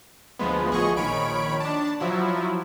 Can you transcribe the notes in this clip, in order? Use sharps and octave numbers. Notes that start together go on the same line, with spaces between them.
D2 F3 G#3 B3
A1 G#4 D#5 C#6
A#1 D#3 C#5 B5 D7
D4 A5
F3 F#3 E4